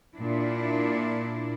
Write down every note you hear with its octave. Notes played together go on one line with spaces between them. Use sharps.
A#2 D4 E4